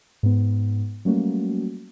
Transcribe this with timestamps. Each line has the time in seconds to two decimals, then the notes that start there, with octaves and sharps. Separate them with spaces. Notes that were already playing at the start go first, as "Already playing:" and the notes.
0.23 G#2 B3
1.05 F#3 G3 A3 A#3 C#4 F#4